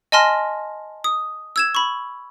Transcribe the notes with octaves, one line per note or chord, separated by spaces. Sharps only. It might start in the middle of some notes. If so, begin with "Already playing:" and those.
D#5 G#5 A5 C6 F6 A#6
D#6
E6 G#6 E7
B5 C#6